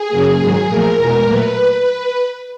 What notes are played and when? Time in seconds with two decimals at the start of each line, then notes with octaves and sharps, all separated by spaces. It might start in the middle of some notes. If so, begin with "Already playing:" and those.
Already playing: G#4
0.08 F#2 C#3 F#3 A#3
0.38 G#2 D#3 F#3
0.67 A#2 F3 A3 A#4
0.96 E2 B2 G#3 B3
1.25 A#2 F#3 A3 B4